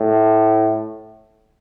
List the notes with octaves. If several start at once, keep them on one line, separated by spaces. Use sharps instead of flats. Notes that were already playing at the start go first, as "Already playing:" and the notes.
Already playing: A2